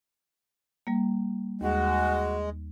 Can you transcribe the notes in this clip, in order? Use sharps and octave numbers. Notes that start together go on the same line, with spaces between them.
G3 A#3
D#2 G#3 F#4